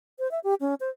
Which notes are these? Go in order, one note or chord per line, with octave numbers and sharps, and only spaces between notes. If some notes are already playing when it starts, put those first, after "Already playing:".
C5
E5
G4
C#4
C5